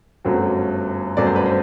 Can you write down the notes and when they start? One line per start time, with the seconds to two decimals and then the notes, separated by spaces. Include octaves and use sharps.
0.25 G1 F#2 F#3 A3 C4
1.17 G1 F#2 F#3 A3 C4 D5
1.27 C5
1.36 B4
1.46 C5